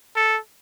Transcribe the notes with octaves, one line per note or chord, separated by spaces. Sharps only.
A4